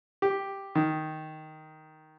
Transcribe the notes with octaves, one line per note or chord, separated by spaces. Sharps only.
G4
D#3